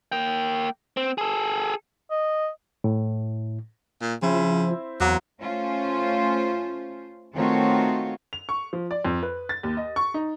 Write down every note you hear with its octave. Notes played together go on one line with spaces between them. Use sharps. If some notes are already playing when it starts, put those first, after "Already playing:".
A#3 G5
C4
G#4 A4
D#5
A2
A#2
C#3 F3 C4 E4 C5
E2 F#3 A#3
A3 C#4 F4 C5
D#3 A3 C4 F4 F#4 C#5
F7
C#6
F3
D5
F2
B4
A6
D#2
D#5
C#6
D#4